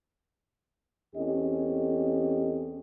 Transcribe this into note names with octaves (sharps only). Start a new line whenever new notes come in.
E2 C4 C#4 G4 A4 D#5